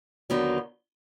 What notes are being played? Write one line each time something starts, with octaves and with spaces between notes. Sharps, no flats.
D#2 D3 F#3 B3 D#4